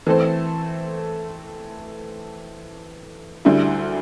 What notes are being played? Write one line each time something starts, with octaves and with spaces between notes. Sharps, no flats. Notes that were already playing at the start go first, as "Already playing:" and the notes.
E3 A3 C4 A4 C5
D2 D3 G3 E4